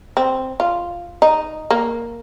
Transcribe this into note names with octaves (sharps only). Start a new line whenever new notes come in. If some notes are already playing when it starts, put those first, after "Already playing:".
C4
F4
D#4
A#3